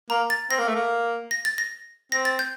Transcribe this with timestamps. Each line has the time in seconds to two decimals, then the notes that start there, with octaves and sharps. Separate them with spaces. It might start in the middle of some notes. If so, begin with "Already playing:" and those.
0.10 A#3 A#5
0.30 A6
0.50 C4 A#6
0.59 A#3
0.68 A3
0.75 A#3
1.31 A#6
1.45 A6
1.58 A#6
2.12 C4 A#6
2.25 A6
2.39 G6